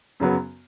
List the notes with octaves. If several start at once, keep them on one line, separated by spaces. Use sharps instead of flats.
F#2 C#3 F#3 B3